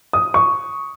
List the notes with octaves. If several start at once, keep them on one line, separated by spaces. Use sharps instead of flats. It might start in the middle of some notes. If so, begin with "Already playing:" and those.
D#6
C#6